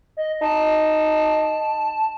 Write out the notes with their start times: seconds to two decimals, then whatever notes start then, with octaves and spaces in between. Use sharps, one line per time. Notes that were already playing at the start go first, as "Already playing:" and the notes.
0.17 D#5
0.41 D#4 A5